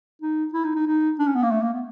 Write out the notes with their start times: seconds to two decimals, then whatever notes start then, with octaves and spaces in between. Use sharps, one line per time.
0.22 D#4
0.54 E4
0.64 D#4
0.75 D#4
0.87 D#4
1.19 D4
1.28 C#4
1.35 B3
1.43 A#3
1.51 A3
1.62 A#3
1.73 B3